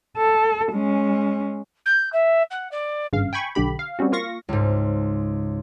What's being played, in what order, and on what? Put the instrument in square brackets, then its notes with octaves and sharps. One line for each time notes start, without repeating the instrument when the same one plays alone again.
[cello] A4
G#3 C#4
[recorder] G6
E5
F#5
D5
[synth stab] G#1 G2 C#3 F5
G5 G#5 B5 C#6
B1 D3 G4 B5
F5
G3 C4 C#4 F#4
A#3 F4 F5 C#6 A#6
[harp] C#2 G#2